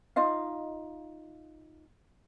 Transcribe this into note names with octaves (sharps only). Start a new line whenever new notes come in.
D#4 F4 D#5 F5